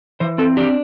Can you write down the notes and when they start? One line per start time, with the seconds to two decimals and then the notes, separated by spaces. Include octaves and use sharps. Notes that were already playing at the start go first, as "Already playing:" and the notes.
0.20 E3 C5
0.38 C4 A4
0.57 D4 G4